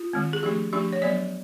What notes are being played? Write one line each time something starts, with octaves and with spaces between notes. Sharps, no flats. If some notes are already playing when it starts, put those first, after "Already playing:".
Already playing: F4
D#3 G#3 C4
G#4
F3 A3 D4 G4
F3 A3 D4 G4
C#5
F#3 B3 D4 D5